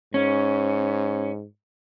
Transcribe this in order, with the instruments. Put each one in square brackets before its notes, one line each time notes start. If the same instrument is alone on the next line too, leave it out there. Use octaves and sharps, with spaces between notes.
[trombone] G#2 [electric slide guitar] C#4